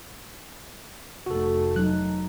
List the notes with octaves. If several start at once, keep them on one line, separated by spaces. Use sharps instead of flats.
F1 A3 F#4 A4
F#3 D#4 F#6